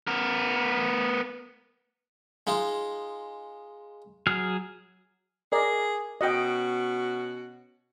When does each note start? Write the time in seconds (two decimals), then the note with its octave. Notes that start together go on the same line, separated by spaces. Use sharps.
0.07 B3 A#4
2.47 G#3 D#4 F4
4.27 F#3 G#4 F6
5.52 G#4 A#4 D5 D#5
6.21 B2 C#4 F#4 D#5 G5